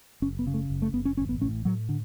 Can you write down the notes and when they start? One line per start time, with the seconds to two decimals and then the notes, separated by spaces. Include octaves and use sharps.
0.22 F#1 C#4
0.39 B3
0.47 C#3
0.54 A3
0.70 F#1
0.82 A3
0.93 F#1 B3
1.05 C#4
1.17 A1 C#4
1.29 B3
1.41 A2 C#4
1.65 A2 F#3
1.89 D3